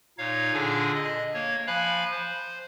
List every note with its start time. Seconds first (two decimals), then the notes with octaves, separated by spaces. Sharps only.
0.18 A#2 D#4 C#5 F5
0.53 A#2 D3 D4 G#4 G#5
0.95 D#5
1.34 A#3 C#5
1.67 F3 F5 G#5 B5 F#6
2.11 C5